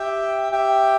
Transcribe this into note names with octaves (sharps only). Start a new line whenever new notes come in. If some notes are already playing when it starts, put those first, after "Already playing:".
Already playing: G4 E5 G5
G4 E5 G5